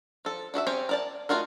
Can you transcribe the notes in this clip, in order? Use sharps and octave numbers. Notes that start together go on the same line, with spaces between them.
F3 A4
D4 F#4 D#5 E5
C4 C#4 G4 G#4 C#5
A#4 D5 A5
A3 D#4 F4 F#4 A#4